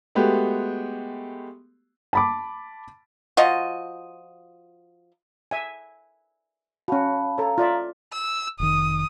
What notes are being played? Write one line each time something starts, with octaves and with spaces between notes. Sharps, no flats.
G#3 A3 B3 F#4 G4
A5 B5 D6
F3 F4 F#4 D#5
E5 G#5
C#4 F#4 F5 A5 B5
A4 C#5 F5 A#5
F4 D5 E5
E6
F1 D#3 D#6